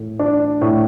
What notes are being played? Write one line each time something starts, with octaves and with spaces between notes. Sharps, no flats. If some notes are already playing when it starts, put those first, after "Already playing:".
Already playing: A2
D4
A2